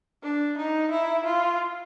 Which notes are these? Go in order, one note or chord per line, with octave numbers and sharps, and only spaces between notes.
D4
D#4
E4
F4